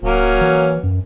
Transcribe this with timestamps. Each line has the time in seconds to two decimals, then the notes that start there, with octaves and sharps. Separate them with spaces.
0.02 D1 F#3 A#3 C#4
0.41 E3
0.83 F#2